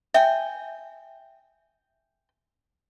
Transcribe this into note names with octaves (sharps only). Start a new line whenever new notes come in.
E5 G5 G#5